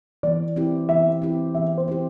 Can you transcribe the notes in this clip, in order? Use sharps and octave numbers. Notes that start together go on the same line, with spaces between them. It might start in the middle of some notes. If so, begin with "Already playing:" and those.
E3 D5
C4 E4 G4
E3 E5
C4 E4 G4
E3 E5
C5
C4 E4 G4